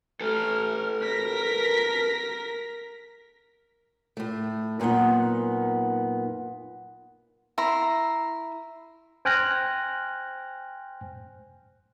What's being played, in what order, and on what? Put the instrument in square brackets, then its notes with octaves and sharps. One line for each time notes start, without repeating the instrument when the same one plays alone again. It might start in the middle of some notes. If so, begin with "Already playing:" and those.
[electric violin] A3 F6 [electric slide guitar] A4 B4
[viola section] A#4 [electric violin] A#6 B6
[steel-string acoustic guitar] A2 A3
F#2 A#2 B3 D#4 F#5
[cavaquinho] E4 A#5 C6
[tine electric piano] C5 G5 G#5 F6 F#6 A#6